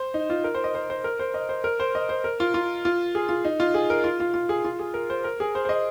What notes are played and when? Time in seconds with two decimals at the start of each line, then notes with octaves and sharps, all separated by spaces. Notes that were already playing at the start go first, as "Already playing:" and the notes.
Already playing: C5
0.14 D#4
0.30 F4
0.44 A#4
0.55 C5
0.64 D#5
0.75 C5
0.90 C5
1.04 A#4
1.20 C5
1.34 D#5
1.49 C5
1.64 A#4
1.80 C5
1.95 D#5
2.09 C5
2.24 A#4
2.40 F4
2.54 F4
2.85 F4
3.15 G#4
3.29 F4
3.45 D#4
3.60 F4
3.74 G#4
3.90 A#4
4.04 F4
4.20 F4
4.34 F4
4.49 G#4
4.65 F4
4.79 G#4
4.94 A#4
5.10 C5
5.24 A#4
5.40 G#4
5.55 C5
5.65 C5
5.69 D#5